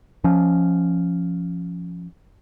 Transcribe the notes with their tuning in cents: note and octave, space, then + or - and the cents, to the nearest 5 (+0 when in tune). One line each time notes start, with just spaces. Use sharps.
F3 -5 C#4 +0